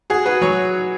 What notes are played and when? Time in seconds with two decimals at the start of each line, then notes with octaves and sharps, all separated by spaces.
0.10 F#4 G#4
0.26 F#4 B4
0.41 F#3 C#5